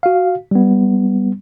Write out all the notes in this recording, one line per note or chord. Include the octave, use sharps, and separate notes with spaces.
F#4 F5
G3 B3